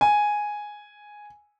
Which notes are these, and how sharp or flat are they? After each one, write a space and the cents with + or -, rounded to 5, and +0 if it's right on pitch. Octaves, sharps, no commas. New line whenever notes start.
G#5 +0